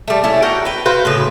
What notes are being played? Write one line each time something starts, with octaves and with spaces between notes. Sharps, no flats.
G3 A3
A3 C#4 E4
F#4 A#4 F#5 G5
B4 G5
F#4 B4 C5 F5
A2 C#3 B4